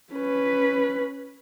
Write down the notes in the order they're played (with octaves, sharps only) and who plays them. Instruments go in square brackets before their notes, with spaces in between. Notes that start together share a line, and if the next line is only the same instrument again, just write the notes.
[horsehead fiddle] C#4 B4